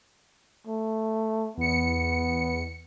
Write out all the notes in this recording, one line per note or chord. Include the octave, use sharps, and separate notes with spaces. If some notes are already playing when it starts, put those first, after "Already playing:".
A3
E2 B3 C#7